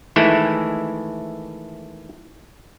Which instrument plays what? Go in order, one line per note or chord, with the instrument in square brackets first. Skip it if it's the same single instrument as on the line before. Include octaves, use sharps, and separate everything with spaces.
[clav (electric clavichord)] D#3 E3 G#3 A3 E4